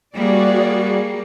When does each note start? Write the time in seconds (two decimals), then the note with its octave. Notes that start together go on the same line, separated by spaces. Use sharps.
0.16 G3 A#3 F#4 G#4 D5